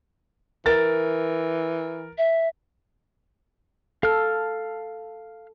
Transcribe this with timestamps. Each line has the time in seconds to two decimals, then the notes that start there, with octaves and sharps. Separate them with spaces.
0.66 E3 A#4 A6
2.18 E5
4.03 A4 F5 F6